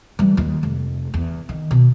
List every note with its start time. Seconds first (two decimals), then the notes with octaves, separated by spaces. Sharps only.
0.19 E3 G3
0.37 D#2 A#3
0.63 F1
1.14 E2
1.49 D#3
1.71 B2